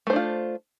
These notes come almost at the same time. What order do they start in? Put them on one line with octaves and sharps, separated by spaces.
A3 C5 D4 F4